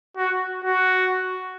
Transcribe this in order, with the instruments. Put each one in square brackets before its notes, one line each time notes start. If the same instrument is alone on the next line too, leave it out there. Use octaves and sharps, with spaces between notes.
[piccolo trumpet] F#4
F#4